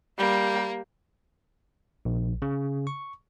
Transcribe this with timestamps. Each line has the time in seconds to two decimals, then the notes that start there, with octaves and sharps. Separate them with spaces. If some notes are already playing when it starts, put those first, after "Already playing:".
0.18 G3 A#3
2.05 A#1
2.42 C#3
2.87 C#6